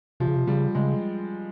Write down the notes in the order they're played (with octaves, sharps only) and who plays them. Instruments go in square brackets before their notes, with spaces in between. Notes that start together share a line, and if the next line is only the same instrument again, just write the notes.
[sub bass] C3 [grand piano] F3
[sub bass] C#3
C3
[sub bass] C#3 [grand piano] G3
[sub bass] C#3 [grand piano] G#3